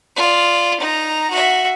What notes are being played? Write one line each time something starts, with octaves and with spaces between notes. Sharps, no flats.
F4 D5
D#4 A#5
F#4 E5